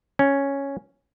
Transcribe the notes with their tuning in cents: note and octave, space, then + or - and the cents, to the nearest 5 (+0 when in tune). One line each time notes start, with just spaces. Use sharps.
C#4 +0